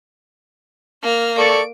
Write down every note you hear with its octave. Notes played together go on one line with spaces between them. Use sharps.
A#3 F6
A4 D5 C#6 D7